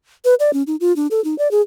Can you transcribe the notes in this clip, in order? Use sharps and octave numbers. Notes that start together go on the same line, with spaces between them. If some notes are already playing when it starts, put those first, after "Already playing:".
B4
D5
C#4
D#4
F4
D4
A4
D#4
D5
G#4